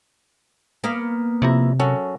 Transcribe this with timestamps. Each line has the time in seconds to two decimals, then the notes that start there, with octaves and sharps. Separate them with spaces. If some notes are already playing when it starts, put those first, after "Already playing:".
0.84 A#3 B3 F5
1.42 F2 C3 E4 A#5
1.80 F#2 C#4 F#4 A4